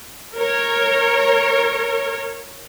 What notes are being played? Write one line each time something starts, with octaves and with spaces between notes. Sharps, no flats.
A#4 C#5